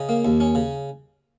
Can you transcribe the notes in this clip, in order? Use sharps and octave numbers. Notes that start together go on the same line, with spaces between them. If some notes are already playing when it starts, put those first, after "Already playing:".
Already playing: C#3 D#5
A#3
D#2
C#4
C#3